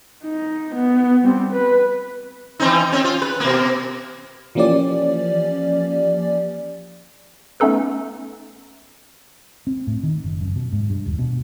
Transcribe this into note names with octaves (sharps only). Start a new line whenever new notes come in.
D#4
B3
G3 C4
B4
E3 C4 D#4
C4 C#4
F4
B4
B2 A#3
E3 F3 A#3 C#4 G4 D5
A3 B3 C#4 D#4 A4 B4
C4
A2
D#3
F#1
F#2
B2
G#2
G2
D#1
B2